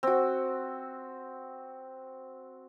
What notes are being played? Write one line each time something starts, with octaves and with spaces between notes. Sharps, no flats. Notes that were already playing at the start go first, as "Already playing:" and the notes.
C4 F#4